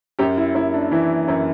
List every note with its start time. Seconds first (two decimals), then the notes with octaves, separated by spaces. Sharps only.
0.19 F#2 G4
0.38 E4
0.55 F#2 E4
0.74 D4
0.91 E3 E4
1.28 F#2 E4